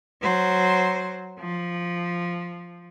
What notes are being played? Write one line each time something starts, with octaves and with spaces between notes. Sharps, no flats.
F#3 C5
F3